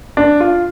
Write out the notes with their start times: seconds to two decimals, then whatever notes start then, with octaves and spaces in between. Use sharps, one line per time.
0.17 D4
0.40 F4